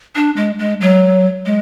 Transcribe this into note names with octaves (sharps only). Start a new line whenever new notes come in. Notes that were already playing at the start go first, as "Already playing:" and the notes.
D4
G#3
G#3
F#3
G#3